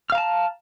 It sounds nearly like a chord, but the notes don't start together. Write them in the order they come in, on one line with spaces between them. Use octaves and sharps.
F6 F5 A#5 A5